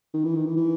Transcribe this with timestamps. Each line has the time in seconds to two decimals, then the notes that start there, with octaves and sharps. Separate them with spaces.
0.14 D#3
0.24 E3
0.36 D#3
0.46 E3
0.57 E3